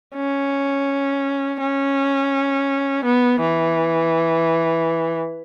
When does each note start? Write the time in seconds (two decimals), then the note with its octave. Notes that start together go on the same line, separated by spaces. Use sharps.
0.15 C#4
1.60 C#4
3.04 B3
3.40 E3